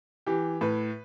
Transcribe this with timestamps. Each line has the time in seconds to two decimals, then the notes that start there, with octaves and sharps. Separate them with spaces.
0.26 E3 G4
0.61 A2 B4